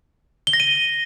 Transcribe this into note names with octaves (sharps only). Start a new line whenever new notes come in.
G7
A#6
D#7